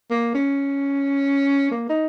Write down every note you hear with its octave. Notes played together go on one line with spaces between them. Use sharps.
A#3
C#4
A#3
D#4